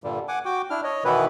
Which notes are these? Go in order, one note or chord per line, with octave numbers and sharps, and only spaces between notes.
G2 A#2 D3 G3
F#5 G#5 D6
F#4 G5 D6
D4 E4 F6
C#5 D#5
B2 D#3 E3 B3 E4 B4